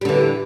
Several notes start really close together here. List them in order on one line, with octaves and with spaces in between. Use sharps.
G3 D3 E3